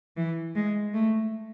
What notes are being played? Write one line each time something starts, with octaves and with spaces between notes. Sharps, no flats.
E3
G#3
A3